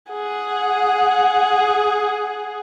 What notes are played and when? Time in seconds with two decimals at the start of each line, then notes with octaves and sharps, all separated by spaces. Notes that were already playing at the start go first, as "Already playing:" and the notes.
0.12 G#4 F#5